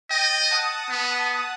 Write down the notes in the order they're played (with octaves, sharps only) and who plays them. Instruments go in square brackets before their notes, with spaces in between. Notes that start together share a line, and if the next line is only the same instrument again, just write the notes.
[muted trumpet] D#5 [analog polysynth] G5 A6
[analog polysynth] F#5 A5 D#6
[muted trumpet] B3